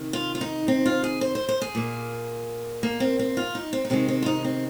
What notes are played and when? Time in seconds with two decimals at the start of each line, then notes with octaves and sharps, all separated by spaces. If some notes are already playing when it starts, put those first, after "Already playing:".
Already playing: C3 D#3
0.13 F4
0.35 F4
0.41 D#4
0.68 C4
0.86 F4
1.04 G#4
1.21 C5
1.35 C5
1.49 C5
1.62 G#4
1.75 A#2 A#3
2.83 A#3
3.00 C4
3.19 C4
3.37 F4
3.55 D#4
3.73 C4
3.85 D#4
3.90 C3 D#3 G#3 C4
4.08 C4
4.22 F4
4.26 D#4
4.44 C4